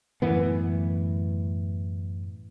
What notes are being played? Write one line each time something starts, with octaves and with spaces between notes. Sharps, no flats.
F#2 A2 E3 B3